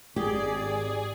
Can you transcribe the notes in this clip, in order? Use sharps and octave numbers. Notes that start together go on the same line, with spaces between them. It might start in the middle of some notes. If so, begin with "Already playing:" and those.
G#1 G4 G#4 D5